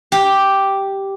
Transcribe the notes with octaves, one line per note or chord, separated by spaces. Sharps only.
G4